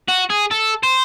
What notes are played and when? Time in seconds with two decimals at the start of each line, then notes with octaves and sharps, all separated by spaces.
0.09 F#4
0.30 G#4
0.51 A4
0.83 C5